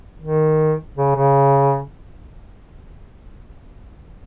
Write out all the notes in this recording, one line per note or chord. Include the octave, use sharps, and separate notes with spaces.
D#3
C#3
C#3